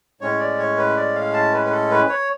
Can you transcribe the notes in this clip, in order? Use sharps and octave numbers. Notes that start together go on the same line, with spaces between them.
A2 G#3 C#4 C#5
D5
C#5
B4
D5
F5
A5
B4
B4
A4
B4
C#5